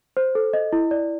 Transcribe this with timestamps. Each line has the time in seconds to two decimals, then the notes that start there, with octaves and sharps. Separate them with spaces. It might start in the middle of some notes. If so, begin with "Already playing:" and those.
0.17 C5
0.35 A4
0.53 D#5
0.73 E4
0.91 D5